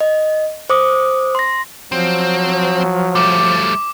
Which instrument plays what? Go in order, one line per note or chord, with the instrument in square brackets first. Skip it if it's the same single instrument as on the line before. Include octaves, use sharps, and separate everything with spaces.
[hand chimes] D#5
C5 D6 D#6
C6 A#6
[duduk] F3 [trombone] F#3 [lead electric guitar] C4
[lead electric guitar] G3 A3 [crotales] D6